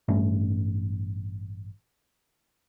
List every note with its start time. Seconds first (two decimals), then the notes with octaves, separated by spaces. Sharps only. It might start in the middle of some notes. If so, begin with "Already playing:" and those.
0.08 A1 G2 A3 C#4